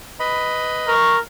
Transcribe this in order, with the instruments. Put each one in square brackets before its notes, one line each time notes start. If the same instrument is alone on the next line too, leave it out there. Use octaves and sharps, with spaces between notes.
[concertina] B4 D#5 B5
[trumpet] A#4 [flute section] C#6